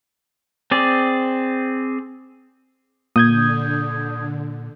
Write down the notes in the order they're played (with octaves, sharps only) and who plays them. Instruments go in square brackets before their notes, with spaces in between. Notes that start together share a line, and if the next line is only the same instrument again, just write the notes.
[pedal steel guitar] C4 G#4 D5
[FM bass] A#2 [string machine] D3 [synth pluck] A#3 [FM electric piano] D#6 G6 G#6